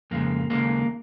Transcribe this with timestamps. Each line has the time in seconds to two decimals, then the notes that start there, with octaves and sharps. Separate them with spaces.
0.11 F2 C#3 G#3 A#3
0.50 D#2 C#3 G#3 A#3